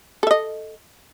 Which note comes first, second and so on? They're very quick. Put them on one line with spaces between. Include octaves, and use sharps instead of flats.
A4 E5 D#5